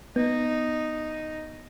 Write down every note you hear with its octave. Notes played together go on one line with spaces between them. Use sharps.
B3 D#4